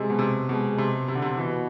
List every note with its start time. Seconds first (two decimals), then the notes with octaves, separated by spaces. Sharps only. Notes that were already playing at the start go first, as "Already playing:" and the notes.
Already playing: C3 G#3
0.10 B2
0.19 C3
0.49 B2 G#3
0.78 C3
1.08 C3
1.15 D3
1.22 C3
1.37 B2 E3